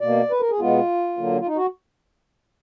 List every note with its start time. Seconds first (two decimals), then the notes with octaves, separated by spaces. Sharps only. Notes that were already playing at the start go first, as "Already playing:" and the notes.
0.01 B2 A#3 D5
0.31 B4
0.40 A#4
0.50 G#4
0.59 B2 G#3 B3 F4
1.17 D3 F#3 A#3
1.40 F4
1.47 D#4
1.56 F#4